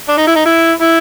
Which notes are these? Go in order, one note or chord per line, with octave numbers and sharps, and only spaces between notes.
D4
D#4
E4
D#4
E4
E4